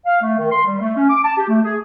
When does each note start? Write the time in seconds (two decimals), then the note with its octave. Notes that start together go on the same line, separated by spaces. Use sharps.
0.06 F5
0.22 A3
0.38 D#3
0.52 C6
0.65 G3
0.81 A3
0.97 C#4
1.10 D6
1.24 A5
1.37 G4
1.49 A3
1.64 G#4